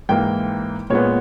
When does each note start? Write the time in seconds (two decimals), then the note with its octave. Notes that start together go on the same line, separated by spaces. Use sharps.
0.09 G#2 E3 A#3 G5
0.90 A#2 G#3 B3 C#5